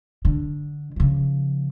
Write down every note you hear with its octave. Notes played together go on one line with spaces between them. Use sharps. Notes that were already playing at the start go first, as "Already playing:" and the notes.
D3
C#3 F3